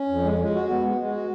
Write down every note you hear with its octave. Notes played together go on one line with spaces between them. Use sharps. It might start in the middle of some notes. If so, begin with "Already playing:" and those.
Already playing: C#4
F2
G#3
G#3
F#4
B3
G#3
G#3
F#4